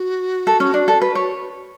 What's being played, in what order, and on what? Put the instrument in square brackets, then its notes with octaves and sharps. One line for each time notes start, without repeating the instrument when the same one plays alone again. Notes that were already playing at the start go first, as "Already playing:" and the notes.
Already playing: [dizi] F#4
[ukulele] A4
C#4
D4
A4
B4
C#5